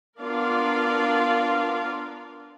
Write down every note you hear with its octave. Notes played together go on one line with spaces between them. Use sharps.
B3 D4 F4 A#4 D5 F5